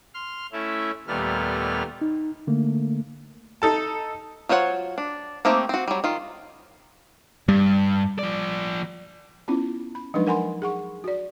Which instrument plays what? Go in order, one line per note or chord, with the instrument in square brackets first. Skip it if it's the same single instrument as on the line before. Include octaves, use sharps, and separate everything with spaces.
[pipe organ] C6 F6
A3 C#4 E4 E5
D#2 A#2 G3 A3 B3 F6
[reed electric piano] D#4
D3 A3 A#3
[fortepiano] D#4 A4 A5
[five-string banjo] F#3 F4 C5 C#5 F#5
D4
A3 A#3 C4 D#4 G4
C4 F#4
F#3 G3
D#3 F4
[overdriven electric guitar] G2 [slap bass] G3
[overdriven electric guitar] F3 D5
[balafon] B3 C#4 E4 F4
B5
F3 F#3 G#3 D4 D#4 B4
A#4 F#5 G#5 B5 C6
G#4 F#5 C#6
F#4 D5